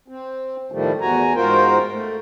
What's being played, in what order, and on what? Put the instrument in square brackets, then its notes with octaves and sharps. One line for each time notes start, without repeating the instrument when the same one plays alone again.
[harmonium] C4
A2 D#3 F3 G3 A3
E2 F#4 G#5 A#5
G#2 F4 F#4 A#4 C5 G5
A3